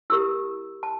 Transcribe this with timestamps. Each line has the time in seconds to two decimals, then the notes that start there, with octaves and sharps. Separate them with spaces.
0.10 E4 G4 A#4 E6
0.83 A5